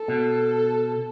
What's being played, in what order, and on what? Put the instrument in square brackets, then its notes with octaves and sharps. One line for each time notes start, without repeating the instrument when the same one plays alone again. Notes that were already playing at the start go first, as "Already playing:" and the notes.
Already playing: [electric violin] A4
[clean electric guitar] B2